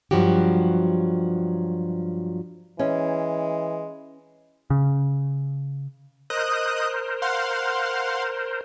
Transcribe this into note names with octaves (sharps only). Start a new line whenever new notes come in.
G2 F3 F#3 F#4 G4
E3 G#3 C#4
C#3
A#4 C5 D#5 D#6 F#6
F5 F#5 C6